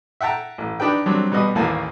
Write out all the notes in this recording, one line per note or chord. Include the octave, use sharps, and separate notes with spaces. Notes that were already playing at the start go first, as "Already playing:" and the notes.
E5 F#5 G5 A5 A#5
A1
D4 D#4 G4 B4 G5
F#3 G3 C4 D4
B2 G3 B4 D#5
A1 D#2 E3 A#3 G#5 A5